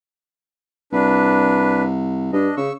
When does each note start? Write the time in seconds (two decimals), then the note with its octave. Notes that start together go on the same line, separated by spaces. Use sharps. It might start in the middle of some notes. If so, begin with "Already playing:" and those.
0.93 C2 D4 B4
2.33 G2 D4 D#5
2.57 C#3 C#6 E6